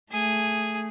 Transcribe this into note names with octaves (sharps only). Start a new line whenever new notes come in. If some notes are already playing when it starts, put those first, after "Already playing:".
A3 G#4